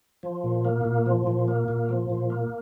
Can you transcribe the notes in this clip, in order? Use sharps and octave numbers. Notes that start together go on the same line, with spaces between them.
F3
A#2
A#3
A#2
F3
A#2
A#3
A#2
F3
A#2
A#3